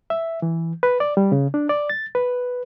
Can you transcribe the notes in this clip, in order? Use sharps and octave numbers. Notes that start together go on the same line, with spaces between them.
E5
E3
B4
D5
G3
C#3
D4
D5
A6
B4